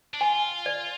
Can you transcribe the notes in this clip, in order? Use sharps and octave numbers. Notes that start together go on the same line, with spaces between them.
D4
F4 G#5
D5